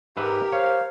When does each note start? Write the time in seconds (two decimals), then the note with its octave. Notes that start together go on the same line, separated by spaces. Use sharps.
0.17 G#2 G4 A#4 B4 E5
0.52 C5 C#5 F5